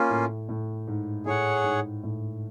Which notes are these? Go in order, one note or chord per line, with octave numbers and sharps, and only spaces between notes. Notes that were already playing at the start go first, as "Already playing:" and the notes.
Already playing: A#3 C#4 F4
A2
A2
G#2
A2 G#4 C#5 F#5
G#2
A2